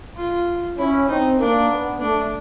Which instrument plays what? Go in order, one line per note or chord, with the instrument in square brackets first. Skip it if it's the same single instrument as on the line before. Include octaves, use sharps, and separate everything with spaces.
[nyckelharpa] F4
[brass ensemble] C#4 [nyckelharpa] E4
[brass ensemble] C4 [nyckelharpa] D#4
[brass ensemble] A#3 [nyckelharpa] D4
[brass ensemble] B3
[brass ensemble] A3 [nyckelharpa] D4